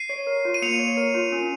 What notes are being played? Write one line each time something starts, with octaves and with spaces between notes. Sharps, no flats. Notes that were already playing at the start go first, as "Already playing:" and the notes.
Already playing: C7 D#7
C#5
A#4
F4
D#7
A#3 C#7 F7
C#5
A#4
F4
C#4